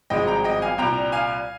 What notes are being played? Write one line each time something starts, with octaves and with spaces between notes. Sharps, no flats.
G#1 G2 F3 G#3 D#5 G5
G5 A#5
D#5 G5
F5 G#5
C2 A#2 G3 G5 A#5
F5 G#5